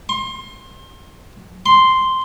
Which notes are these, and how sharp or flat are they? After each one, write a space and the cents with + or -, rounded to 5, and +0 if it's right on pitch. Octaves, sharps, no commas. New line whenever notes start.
C6 +30
C6 -5